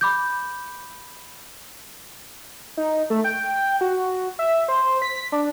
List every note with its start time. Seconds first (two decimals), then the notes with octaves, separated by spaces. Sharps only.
0.01 B5 D6 G6
2.77 D#4
3.10 A3
3.24 G5
3.81 F#4
4.39 E5
4.68 C5
5.02 B6
5.32 D4